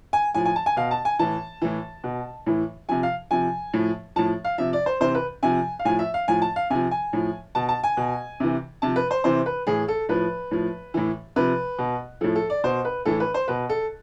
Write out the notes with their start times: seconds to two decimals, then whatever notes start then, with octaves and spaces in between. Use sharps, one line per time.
0.13 G#5
0.35 A2 F3 G#5
0.45 G#5
0.56 A5
0.66 G#5
0.77 B2 F5
0.91 A5
1.05 G#5
1.19 A2 E3 A5
1.62 A2 E3
2.04 B2
2.46 A2 E3
2.89 C3 F3 G#5
3.03 F5
3.31 C3 F3 G#5
3.74 A2 F3
4.16 A2 F3 A5
4.45 F5
4.58 C3 F3 E5
4.73 D5
4.86 C5
5.01 C3 E3 C5
5.15 B4
5.43 C3 F3 G#5
5.79 F5
5.85 A2 F3 G#5
5.99 E5
6.14 F5
6.28 A2 F3 G#5
6.42 A5
6.56 F5
6.70 C3 F3 G#5
6.91 G#5
7.13 A2 F3
7.55 B2 A5
7.69 A5
7.84 G#5
7.97 B2
8.40 C3 E3
8.82 C3 F3 A5
8.96 B4
9.11 C5
9.24 C3 E3 C5
9.46 B4
9.67 A2 E3 G#4
9.88 A4
10.09 A2 F3 B4
10.51 A2 F3
10.94 A2 E3
11.36 C3 F3 B4
11.79 B2
12.21 A2 F3 A4
12.36 A4
12.50 D5
12.64 B2 C5
12.85 B4
13.05 A2 E3 A4
13.20 B4
13.34 C5
13.48 B2 B4
13.69 A4